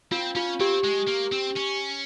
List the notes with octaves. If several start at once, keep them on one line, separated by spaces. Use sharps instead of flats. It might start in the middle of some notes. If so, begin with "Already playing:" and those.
C4 F4
C#4 F4
C4 G4
G#3
A#3
C4
C#4